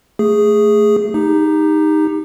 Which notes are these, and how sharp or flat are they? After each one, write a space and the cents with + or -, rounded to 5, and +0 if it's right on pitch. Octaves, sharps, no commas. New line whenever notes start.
A3 +10 G#4 -5
D#4 +0 G4 +25